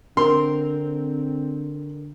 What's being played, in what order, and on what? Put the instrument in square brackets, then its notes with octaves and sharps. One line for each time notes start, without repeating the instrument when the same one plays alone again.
[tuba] D3 [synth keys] C4 [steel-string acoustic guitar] A#4 [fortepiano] C6